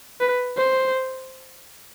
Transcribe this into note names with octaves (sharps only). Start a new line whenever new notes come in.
B4
C5